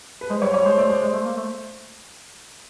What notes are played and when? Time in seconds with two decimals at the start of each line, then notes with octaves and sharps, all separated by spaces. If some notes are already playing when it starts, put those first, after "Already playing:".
0.21 B4
0.30 G#3 C5
0.42 G3 C#5
0.53 G3 C#5
0.66 G#3 C5
0.78 A3 D5
0.89 G#3 C5
1.01 G#3
1.13 A3
1.25 A#3
1.37 A3